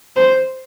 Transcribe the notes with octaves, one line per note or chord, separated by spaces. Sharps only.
C5